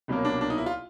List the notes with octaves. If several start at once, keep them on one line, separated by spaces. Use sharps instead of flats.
C2 B2 F#3 A#3
D4
D4
D#4
E4
F4